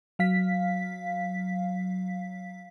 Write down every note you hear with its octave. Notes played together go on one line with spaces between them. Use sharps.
F#3 F5 B6